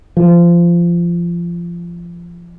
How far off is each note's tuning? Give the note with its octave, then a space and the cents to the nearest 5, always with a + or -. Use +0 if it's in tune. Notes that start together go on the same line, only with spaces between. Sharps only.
F3 -20